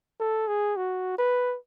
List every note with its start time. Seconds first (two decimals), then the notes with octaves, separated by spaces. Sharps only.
0.20 A4
0.48 G#4
0.76 F#4
1.18 B4